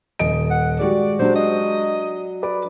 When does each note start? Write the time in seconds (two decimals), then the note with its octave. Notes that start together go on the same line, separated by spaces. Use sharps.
0.19 D#1 D#5 D7
0.51 F#5
0.79 G#3 F#4 G4 D5
1.19 F#3 D4 C5
1.36 D#5
2.43 B4 D5